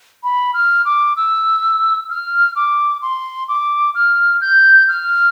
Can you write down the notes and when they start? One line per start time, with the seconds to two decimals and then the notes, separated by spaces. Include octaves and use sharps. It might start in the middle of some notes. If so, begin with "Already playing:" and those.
0.24 B5
0.54 F6
0.85 D6
1.17 E6
2.10 F6
2.56 D6
3.02 C6
3.48 D6
3.95 F6
4.41 G6
4.88 F6